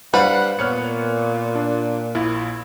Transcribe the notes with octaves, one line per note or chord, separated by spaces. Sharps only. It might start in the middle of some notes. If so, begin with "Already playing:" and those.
G3 D4 B4 C5 F5 F#5
A#2 B3 C#5 F6 F#6 C#7
D4
A#1 E4